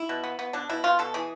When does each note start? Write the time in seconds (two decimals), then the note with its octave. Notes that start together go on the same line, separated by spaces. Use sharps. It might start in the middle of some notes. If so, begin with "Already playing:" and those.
Already playing: E4
0.09 B2
0.24 B3
0.39 B3
0.53 B2 D4
0.69 B2 E4
0.84 B2 F4
0.99 B2 A4
1.14 E3 G#4